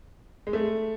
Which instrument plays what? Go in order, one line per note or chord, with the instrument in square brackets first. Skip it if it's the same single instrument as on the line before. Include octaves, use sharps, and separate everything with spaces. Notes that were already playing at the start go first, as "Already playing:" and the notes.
[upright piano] G#3
A3